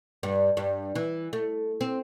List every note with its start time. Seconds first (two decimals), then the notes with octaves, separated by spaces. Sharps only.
0.23 G2
0.57 G2
0.95 E3
1.33 A3
1.81 C4